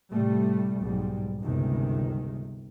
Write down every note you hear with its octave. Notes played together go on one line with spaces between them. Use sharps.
A2 C3 G3 A3
B1 G#2 G3
G1 C#2 C3 D#3